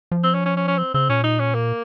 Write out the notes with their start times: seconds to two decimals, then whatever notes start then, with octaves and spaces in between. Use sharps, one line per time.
0.12 F3
0.24 C4
0.34 C#4
0.45 C#4
0.57 C#4
0.68 C#4
0.78 C4
0.94 C#3 C4
1.09 A#2 C#4
1.24 D#4
1.40 C#4
1.54 A#3